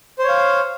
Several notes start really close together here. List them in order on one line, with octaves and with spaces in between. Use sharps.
C5 C#5 F5